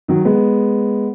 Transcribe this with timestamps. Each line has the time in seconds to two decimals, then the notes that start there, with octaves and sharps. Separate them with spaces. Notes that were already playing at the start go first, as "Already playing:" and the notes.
0.08 D#3 F#3
0.25 G#3 B3